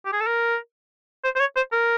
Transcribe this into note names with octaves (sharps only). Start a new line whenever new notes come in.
G4
G#4
A4
A#4
C5
C5
C#5
C5
A#4